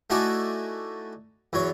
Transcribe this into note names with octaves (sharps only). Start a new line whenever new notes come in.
A3 D#4 E4 F#4 D5 G#5
E2 F#3 C#5